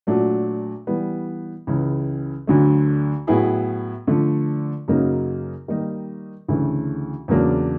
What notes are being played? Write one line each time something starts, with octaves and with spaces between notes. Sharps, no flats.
A#2 F#3 A3 D4 F#4
E3 G3 B3
C#2 C#3 E3
D2 D3 F#3 A3
A2 F#3 B3 E4 G#4
D3 F3 A3
F#2 C#3 F#3 A#3 D#4
D#3 G3 A#3 D#4
D2 C#3 E3 A3
E2 C#3 F#3 A#3 D4